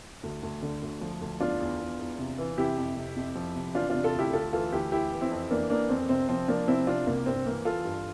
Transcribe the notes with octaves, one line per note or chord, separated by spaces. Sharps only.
D2
D2
D3
D2
F3
D2
E2 D4 F4
E2
E2
E2
C3
E3
C3 E4 G4
F2
C3
F2
F3
C3
E3 D4 F4
C3 D4 F4
F4 A4
D2 E4 G4
D2 F4 A4
E3 F4 A4
D2 E4 G4
E3 E4 G4
E3
C4 E4
F2
E3 A#3 D4
E3 A#3 D4
F2 C4
C3 C4
F3 C4
F3 A#3 D4
C3 C4 E4
C3 D4 F4
C2 A#3
G2 C4
E3 A#3
E3 F4 A4
G2